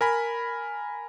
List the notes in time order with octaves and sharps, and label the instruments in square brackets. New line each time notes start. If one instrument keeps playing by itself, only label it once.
[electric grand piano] A#4 G#5 B5